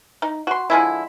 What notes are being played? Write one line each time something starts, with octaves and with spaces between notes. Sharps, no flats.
D#4
F#4 C6
D3 F3 G#3 E4